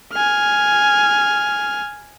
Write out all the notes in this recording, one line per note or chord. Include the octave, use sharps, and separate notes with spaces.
G#5 F6